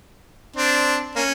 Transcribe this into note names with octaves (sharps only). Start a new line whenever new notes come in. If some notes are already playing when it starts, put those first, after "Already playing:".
C4 D4
A#3 C#4